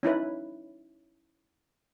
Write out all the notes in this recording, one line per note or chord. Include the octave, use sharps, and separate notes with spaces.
C#4 D#4 E4 B4